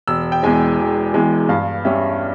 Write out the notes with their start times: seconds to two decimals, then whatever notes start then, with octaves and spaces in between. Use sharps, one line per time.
0.08 E1 E6
0.32 G5
0.43 E2 E3 G#3 G#5
0.79 E1
1.14 E2 E3 G#3
1.49 G2 F5
1.85 G3 C#4 E5